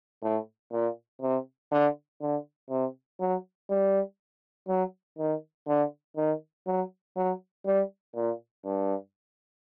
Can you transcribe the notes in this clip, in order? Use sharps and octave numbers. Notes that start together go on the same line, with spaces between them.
A2
A#2
C3
D3
D3
C3
F#3
G3
F#3
D#3
D3
D#3
F#3
F#3
G3
A#2
G2